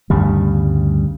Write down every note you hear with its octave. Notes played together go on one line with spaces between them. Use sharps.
D2 G2 C#3 G3